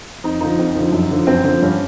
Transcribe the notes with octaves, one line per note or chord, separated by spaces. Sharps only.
F2 D#4
D3 F3 D#4
F2
D3 F3
F#2
D3 F3
F#2 C4
D3 F3
G2 C#4